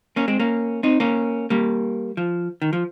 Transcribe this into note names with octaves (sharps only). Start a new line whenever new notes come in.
A#3 C#4
G#3 C4
A#3 C#4
C4 D#4
A#3 C#4
G3 A#3
F3
D#3
F3